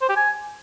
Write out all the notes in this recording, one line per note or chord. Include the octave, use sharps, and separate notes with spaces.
C5
G4
G#5